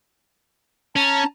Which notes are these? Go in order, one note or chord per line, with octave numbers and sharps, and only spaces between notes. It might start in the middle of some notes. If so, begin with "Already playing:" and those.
C#4 A5 A#5